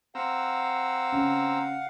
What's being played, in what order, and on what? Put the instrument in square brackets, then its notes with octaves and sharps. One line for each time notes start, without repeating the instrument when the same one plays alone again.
[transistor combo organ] C4 A#5 E6 [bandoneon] F5 F#5
[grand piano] C#3